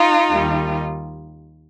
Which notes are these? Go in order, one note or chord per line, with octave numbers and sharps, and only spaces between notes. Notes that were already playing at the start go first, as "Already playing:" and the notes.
Already playing: D#4 F4
D#2 D#3 G3